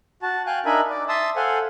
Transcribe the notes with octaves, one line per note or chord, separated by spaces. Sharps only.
F#4 A5
F5 G5 G#5 F#6
D4 D#4 A#4 E5 G#5 B5
D5
E5 A5 C6 D#6 E6
A4 C5 F5 F#5 G#5